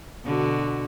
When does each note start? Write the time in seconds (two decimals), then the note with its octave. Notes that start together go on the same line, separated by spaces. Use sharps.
0.24 B2 D3 F#4